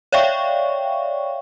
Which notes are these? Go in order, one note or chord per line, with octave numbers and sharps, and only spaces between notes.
C#5 D5 E5 F5 G5 C#6